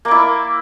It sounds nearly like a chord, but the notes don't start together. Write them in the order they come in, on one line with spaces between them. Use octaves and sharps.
A#3 D5 E4